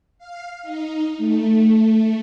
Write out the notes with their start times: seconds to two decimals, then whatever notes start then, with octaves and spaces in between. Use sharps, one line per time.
0.18 F5
0.63 D#4
1.18 A3